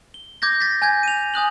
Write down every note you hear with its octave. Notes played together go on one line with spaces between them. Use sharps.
G7
D6 G6 G#6 A#6
A6 B6
G#5 G6 G#6
D#7 F7
G#5 D#6 F#6 F#7